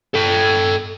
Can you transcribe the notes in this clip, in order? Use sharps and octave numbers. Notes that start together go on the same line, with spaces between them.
A4 G5